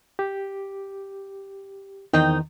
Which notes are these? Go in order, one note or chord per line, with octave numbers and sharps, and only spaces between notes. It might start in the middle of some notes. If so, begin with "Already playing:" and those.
G4
E2 D#3 C4 D#4 G5